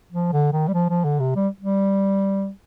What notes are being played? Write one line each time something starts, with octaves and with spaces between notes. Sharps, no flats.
F3
D3
D#3
G3
F3
F3
D3
C3
G3
G3